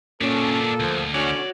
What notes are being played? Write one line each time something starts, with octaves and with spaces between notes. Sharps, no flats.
A#2 A#3 B3 C#4 D4 A4
D2 F3
D3 C#4 F#4 C#5 D5